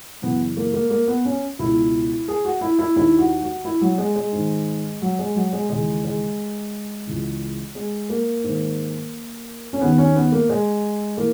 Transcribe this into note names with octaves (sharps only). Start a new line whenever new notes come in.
F#2 C#3 E3 B3
A#3
A#3
A#3
B3
C#4
C#2 B2 E4
G#4
F#4
E4
E4
D#2 D#3 E4
F#4
F#4
E4
F#3
G#3
G#3
G#2 D#3
F#3
G#3
F#3
G#3
D#2 C#3 E3 G#3
G#3
C#2 C#3 E3
G#3
A#3
G#2 D#3
C#4
D#2 D#3 B3
C#4
B3
A#3
G#3
E3 A#3